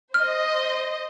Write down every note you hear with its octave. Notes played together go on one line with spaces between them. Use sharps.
C5 D#5 F6